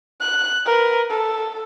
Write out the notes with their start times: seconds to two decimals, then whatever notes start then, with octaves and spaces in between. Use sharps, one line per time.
0.21 F#6
0.66 A#4 B4
1.10 A4